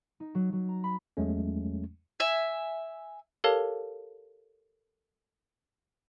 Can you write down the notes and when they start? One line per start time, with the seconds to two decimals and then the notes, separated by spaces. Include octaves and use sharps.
0.20 D#4
0.35 F#3
0.53 F#3
0.69 A#5
0.84 B5
1.17 E2 F#3 G#3 A3 C#4
2.20 E5 G#5
3.44 G4 A4 A#4 C#5 F5 A5